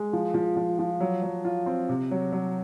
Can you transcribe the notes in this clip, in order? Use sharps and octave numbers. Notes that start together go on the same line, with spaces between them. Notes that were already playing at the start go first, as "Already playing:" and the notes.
Already playing: G#3
F3
F3
F3
F3
F#3
F#3
F4
C4
C3
F#3
F#3